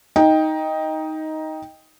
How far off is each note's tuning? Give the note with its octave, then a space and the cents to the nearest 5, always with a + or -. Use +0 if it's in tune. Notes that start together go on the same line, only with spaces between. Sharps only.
D#4 +10 G5 +5